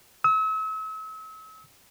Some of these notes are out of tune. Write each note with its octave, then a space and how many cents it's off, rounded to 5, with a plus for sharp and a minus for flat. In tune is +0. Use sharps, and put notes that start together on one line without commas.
E6 -40